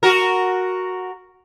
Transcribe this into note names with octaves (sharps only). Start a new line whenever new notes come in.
F#4 A#4